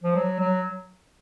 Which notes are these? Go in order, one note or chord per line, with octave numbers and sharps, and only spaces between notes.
F3
F#3
F#3